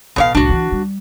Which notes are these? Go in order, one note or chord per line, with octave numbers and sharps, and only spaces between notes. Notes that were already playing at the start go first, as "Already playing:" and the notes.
A1 B2 F#3 C#5 F5
C2 A2 D4 F#4
E3
G3